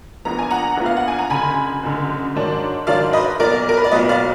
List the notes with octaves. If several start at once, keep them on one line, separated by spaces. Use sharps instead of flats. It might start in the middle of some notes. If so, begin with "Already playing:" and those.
A#1 A#2 F3 B3 A#5
G#5
F#5 A#5
A#1 A#2 F3 B3
F5
F#5
G#5
A#5
F#1 F#2 D3 G#5 B5
F#1 F#2 D3
G#2 D#3 F#3 D4
G#2 D#3 F#3 D4 D5 F5
B4 D#5
B1 A#2 F#3 B3 A#4 D5
A#4
B4
D5
B1 A#2 F#3 B3 B4 D#5
D5 F5